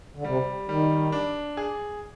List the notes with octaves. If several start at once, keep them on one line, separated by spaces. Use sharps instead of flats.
D3
C3 G3
D#3 G3
D4
G#4